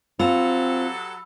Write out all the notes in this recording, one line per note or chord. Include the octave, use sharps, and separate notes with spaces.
F#3 C4 F4 G4 A4 B5 E6